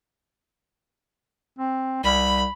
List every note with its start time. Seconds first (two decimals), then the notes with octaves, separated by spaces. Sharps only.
1.59 C4
2.03 C2 B5